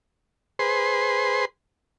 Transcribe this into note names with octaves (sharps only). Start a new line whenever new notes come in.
G#4 B4 C5 C6